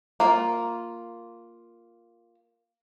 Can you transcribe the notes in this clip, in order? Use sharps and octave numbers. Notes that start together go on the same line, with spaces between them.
A#3 F4